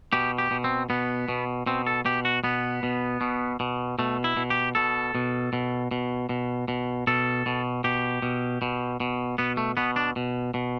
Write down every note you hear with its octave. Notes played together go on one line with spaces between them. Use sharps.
B2 G4
G4
B2
C4
B2 B3
B2
B2 C4
A4
B2 G4
F#4
B2 B3
B2
B2
B2
B2 A3
E4
B2
G4
B2 A4
B2
B2
B2
B2
B2
B2 A4
B2
B2 G4
B2
B2
B2
B2 B3
A3
B2 B3
D4
B2
B2